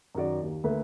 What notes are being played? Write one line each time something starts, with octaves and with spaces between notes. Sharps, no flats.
F#2 D#3 F#4 D5
D#2
D2 A#3 A4 B4 E5